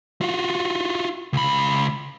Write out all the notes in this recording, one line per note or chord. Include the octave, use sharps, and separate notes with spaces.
F4 F#4
C#2 B5